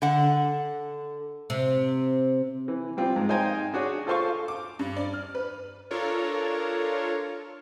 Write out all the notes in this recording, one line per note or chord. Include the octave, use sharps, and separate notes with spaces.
D3 F#5
C3
E3
G3 C4 F4
G#2
D#4 C5 F5 G5 G#5 A#5
D4 F#4 G#4 C#5
F4 A4 C5 F5 C6 C#6
D6
G2
D5
F6
B4
D4 F4 A4 A#4 C#5